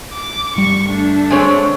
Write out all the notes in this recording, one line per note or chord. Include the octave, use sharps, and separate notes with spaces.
D6
G1 G3 C#6
A3 D4
G#3 C4 C#5